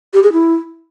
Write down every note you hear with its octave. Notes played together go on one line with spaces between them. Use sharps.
G4
G#4
E4